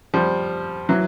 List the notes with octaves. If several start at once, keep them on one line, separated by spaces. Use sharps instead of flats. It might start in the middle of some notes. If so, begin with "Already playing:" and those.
F3 G3
E3 F#3